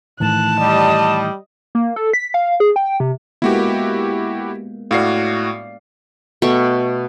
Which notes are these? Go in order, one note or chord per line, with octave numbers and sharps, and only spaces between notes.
A2 D#3 E3 A5 F#6
G3 D#5
A#3
A4
B6
F5
G#4
G5
C3
G#3 A#3 B3 E4 F#4 G4
A2 F#4 D5 F5 C7
B2 A3 G5 C#6